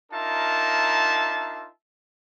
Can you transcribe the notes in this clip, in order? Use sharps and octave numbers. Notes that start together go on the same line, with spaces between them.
D4 D#4 F4 A#4 E5 A5